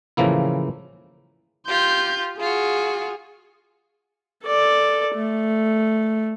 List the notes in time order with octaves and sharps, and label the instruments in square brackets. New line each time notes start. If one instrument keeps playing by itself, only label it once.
[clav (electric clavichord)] A2 C#3 E3 F3 A#3 E4
[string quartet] F4 G4 [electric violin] C6 G6
[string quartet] F4 F#4 [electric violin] G#4
[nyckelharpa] A4 D5
A3